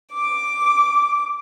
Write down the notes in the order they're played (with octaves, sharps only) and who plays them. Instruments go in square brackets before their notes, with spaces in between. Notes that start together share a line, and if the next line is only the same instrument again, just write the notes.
[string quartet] D6